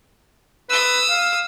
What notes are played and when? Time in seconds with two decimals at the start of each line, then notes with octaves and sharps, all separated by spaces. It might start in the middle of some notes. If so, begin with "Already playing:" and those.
0.70 B4 D#6 E6
1.10 F5